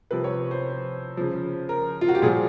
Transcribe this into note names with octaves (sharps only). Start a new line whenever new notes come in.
C3 F3 B4
C#5
C5
C#3 F3
A#4
F4
F#4
G4
A#2 F3 G#4